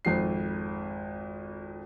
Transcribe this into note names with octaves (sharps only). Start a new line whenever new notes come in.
G#1 F2 C7